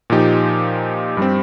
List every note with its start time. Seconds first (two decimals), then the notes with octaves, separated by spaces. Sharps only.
0.10 A#2 F3 D#4 G4
1.17 G2 G3 C4